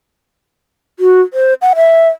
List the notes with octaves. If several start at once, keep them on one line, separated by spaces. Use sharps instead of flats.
F#4
C5
F#5
E5